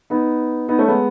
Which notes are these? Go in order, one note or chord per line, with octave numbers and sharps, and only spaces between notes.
B3 D#4
B3 D#4
A3 C#4
G#3 B3